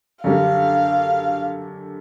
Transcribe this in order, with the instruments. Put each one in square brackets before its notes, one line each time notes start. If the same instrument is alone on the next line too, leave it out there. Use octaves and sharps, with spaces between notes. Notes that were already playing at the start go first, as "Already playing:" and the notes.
[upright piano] F#2 D3 G3 [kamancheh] F5